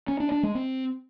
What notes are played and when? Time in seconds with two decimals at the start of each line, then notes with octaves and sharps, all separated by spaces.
0.08 C#4
0.20 D4
0.32 D4
0.43 G#3
0.55 C4